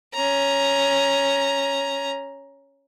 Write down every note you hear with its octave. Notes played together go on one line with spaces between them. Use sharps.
C#4 A#5